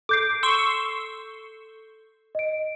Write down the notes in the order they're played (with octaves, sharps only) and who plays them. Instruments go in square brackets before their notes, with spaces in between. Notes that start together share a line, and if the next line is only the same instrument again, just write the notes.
[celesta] A4 G6 C7 [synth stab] D6
[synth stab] C6 C#6 E6
[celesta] D#5 D7